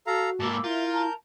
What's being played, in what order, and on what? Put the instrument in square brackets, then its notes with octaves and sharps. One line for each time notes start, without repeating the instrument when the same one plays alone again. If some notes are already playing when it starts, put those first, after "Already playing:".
[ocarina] F#4 [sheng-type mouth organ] A4 F5 A#5
[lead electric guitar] G#2 A#3 [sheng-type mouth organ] A5 [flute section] B5 D6 E6
[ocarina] E4 [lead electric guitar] F4 [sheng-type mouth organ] A#4 G6 [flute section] E5
[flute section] A5 A#5